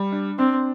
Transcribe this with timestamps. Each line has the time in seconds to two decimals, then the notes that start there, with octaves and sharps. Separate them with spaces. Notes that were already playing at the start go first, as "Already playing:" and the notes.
Already playing: G3
0.12 D4
0.39 C4 D4